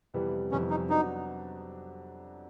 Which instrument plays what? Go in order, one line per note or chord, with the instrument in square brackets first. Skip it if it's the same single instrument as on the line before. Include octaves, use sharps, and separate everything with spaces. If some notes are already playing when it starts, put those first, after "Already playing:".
[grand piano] F2 C3 E3 G3 B3
[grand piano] F2 C3 E3 G3 B3 [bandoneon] C#4
[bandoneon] D#4
[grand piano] F#3 B3 D4 F#4 [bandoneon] D#4